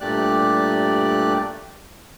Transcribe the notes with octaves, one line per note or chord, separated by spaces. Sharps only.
G2 A#2 A3 G4 D5 F#6